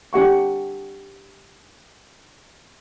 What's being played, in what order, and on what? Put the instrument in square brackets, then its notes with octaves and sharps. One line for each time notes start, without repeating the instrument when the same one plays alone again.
[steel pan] D4 G4 F#5 C#6